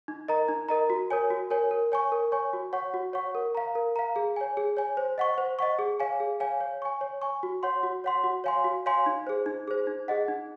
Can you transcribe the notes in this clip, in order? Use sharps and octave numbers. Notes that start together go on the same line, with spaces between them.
D#4
A#4 D#5 A#5
D#4
A#4 D#5 A#5
F#4
A#4 C#5 G#5
F#4
A#4 C#5 G#5
A#4
C#5 G#5 C#6
A#4
C#5 G#5 C#6
F#4
C#5 F#5 C#6
F#4
C#5 F#5 C#6
A#4
F5 A#5
A#4
F5 A#5
G#4
C#5 G#5
G#4
C#5 G#5
C5
D#5 F#5 C#6
C5
D#5 F#5 C#6
G#4
C#5 F5 G#5
G#4
C#5 F5 G#5
C#5
G#5 C#6
C#5
G#5 C#6
F#4
C#5 F#5 C6
F#4
C#5 F#5 C6
F#4
C#5 F5 G#5 C6
F#4
C#5 F5 G#5 C6
D#4
G#4 C5
D#4
G#4 C5
D#4
G#4 D#5 F#5
D#4